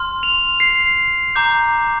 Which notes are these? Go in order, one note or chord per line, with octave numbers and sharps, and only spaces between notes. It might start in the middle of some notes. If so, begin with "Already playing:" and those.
Already playing: C6 F6
F7
C7
A#5 D6 G6